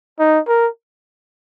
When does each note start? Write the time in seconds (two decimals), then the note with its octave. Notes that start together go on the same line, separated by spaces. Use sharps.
0.19 D#4
0.47 A#4